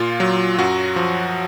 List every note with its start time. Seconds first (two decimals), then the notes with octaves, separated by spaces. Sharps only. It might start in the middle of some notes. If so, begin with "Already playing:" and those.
Already playing: A#2 F4
0.20 F#3
0.59 F#2 F#4
0.96 F3